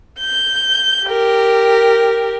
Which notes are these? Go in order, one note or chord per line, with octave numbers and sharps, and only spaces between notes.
G6
G4 A#4